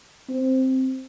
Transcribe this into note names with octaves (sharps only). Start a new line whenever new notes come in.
C4